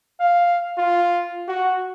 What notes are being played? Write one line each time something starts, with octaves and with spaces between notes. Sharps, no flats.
F5
F4
F#4